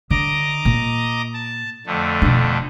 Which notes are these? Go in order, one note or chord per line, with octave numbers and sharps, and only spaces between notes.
D3 D#5 A#5 D6
A#2
A5
F2 D3 A3
B2 D4